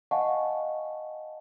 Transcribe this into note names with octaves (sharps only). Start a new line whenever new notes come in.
D#5 F5 F#5 G#5 A5 C#6